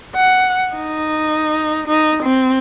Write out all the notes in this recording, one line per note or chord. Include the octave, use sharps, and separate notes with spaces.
F#5
D#4
D#4
C4